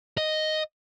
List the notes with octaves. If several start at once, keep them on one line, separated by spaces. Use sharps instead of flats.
D#5